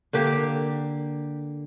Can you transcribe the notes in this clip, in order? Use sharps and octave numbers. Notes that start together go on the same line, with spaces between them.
D3 A#3 G4